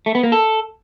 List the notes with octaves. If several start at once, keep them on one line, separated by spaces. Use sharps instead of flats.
A3
B3
A#3
A4